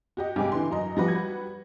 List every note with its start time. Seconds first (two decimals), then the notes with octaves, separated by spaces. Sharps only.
0.17 F#4 G4 D#5
0.36 G2 C3 G#3 G4 G#5 D6
0.52 D3 E3 C6
0.71 F#2 D#5 A#5
0.97 F3 G3 F#4 G4 B4 A#6
1.08 G#6